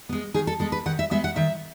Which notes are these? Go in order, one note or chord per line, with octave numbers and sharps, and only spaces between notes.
G#3 B3
D#3 G#4
A4
G#3 B3 A4
B4
D#3 F#5
E5
G#3 B3 E5
F#5
D#3 E5